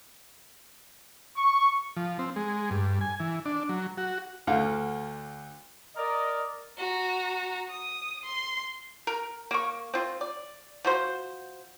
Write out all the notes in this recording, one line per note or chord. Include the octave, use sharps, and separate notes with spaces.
C#6
F3
C4
G#3
G2
G#5
E3
D4
F#3
F#4
D2 D3 F5
A#4 D5 D#5
F#4 A#5
D#6
C6
A#4
A#3 C#6
C4 F4
D5
F3 F#4 C5